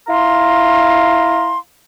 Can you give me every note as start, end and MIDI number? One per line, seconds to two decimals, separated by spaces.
0.08 1.56 64
0.08 1.56 77
0.08 1.56 82
0.08 1.56 84